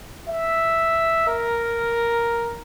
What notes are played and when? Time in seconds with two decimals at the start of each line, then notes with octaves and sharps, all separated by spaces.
0.29 E5
1.28 A#4